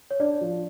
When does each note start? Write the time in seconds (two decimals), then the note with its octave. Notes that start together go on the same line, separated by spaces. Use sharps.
0.11 C#5
0.20 D4 D5
0.41 F3